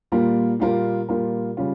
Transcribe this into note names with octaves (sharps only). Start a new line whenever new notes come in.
A#2 G3 A#3 F4 A#4
A#2 G3 A#3 F4 A#4
A#2 G3 A#3 F4 A#4
C#3 G3 C#4 F4